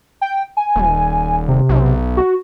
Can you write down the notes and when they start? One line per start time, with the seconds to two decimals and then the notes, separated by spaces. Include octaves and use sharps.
0.21 G5
0.57 G#5
0.76 D#1
1.48 C3
1.69 B1
2.17 F#4